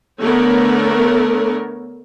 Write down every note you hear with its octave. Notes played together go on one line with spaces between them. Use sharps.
D3 A3 B3 A4 A#4 C#5